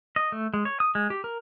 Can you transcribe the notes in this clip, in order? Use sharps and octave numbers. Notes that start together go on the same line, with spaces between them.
D#5
A3
G#3
C#5
D#6
G#3
G4
A#4